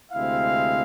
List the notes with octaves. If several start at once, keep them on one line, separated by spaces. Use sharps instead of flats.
D2 C3 G#3 C4 E4 F5